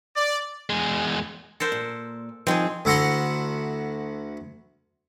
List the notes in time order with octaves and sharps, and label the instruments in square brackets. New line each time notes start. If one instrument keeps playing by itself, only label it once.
[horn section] D5
[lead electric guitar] E2 G#3
[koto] A4 A#4 C5
[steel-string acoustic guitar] A#2
[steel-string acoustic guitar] D#3 F3 [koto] C4 G#4
[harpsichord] D2 E4 F#5 A#5 C6